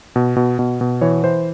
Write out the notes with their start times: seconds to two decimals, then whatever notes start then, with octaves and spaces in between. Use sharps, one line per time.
0.16 B2
0.36 B2
0.59 B2
0.81 B2
1.01 E3 C#5
1.24 E3 C5